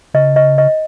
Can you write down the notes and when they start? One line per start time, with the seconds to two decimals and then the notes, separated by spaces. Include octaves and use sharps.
0.14 C#3 D#5
0.36 D#5
0.58 D#5